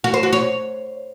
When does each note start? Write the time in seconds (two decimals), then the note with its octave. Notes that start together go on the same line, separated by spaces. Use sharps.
0.04 F#4
0.14 C5
0.23 F#4
0.33 C#5